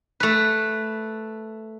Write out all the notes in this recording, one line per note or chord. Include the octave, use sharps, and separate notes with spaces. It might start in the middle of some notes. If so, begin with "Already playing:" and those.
A3 B4